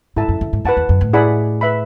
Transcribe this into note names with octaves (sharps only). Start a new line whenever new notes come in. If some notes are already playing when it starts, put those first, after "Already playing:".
G#2 E4 A4 E5 A5
F#2
F#2
G#2
F#2 B4 F#5 A5
E2
F#2
A2
E4 G#4 D5 F#5 B5
B4 E5 B5